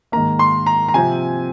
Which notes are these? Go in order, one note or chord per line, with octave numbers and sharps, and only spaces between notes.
G#2 D#3 A#3 A#5
C6
A#5
A#5
C3 F3 C4 G#5